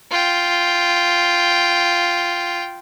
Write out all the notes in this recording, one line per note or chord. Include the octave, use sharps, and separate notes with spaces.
F4 G5